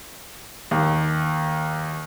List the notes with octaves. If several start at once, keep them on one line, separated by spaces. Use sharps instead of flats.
D#2